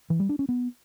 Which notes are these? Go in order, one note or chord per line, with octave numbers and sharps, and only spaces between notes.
E3
G3
D4
C#4
B3